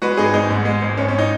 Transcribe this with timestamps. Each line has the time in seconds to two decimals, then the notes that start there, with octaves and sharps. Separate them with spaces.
0.02 G#3 F#4 B4
0.17 G#1 D#4 G#4
0.34 G#1 D#4
0.50 G#2
0.65 G#3
0.82 G#1
0.97 G#1 C#4
1.08 C#4
1.18 D#4